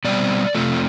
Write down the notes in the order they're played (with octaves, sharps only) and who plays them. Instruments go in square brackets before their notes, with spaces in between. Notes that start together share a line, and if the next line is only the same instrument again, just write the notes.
[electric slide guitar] B2 G3 C4 D5
F2 C3 F3 A3